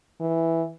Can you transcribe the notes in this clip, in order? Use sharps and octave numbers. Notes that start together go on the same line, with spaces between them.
E3